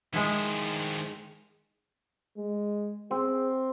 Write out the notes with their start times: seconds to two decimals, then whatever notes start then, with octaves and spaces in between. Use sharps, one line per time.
0.13 D#3 F3 G#3 E4
2.37 G#3
3.11 C4 G#4